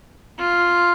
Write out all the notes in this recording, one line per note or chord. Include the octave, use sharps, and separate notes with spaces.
F4